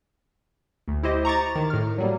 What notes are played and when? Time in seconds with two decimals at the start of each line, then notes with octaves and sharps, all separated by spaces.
0.88 D2
1.03 E4 G4 C5 D#5
1.25 A#5 C#6 D6 A6
1.55 D#3
1.70 A2 F6
1.98 F#3 G3 A#3